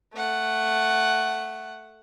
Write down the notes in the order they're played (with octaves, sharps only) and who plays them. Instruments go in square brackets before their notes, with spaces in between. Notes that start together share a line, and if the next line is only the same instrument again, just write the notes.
[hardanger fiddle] A3 F#5